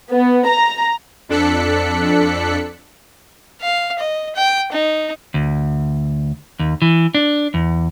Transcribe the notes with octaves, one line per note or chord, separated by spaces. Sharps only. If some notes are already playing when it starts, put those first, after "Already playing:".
B3
A#5
F2 D4 A4 F#6 B6 C#7
F5
D#5
G5
D#4
D2
D#2
E3
D4
E2